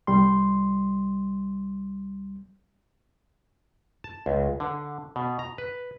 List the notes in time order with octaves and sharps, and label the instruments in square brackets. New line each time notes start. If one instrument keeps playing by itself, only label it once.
[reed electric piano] C2 G3 C6
[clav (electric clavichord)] A5
C#2
D3
B2
A#5
B4